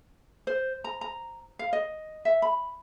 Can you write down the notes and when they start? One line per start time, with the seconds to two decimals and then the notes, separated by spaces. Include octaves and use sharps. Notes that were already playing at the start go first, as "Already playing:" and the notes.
0.47 C5
0.84 A#5
1.01 A#5
1.59 F5
1.73 D#5
2.25 E5
2.42 B5